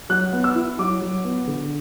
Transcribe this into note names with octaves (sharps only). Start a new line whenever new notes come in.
F#3 F#6
B3
E6
E4
F#3 D6
F#3
B3
D3